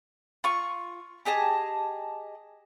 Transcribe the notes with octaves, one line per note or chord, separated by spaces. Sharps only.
F4 C#6
G4 G#4 D#5 A5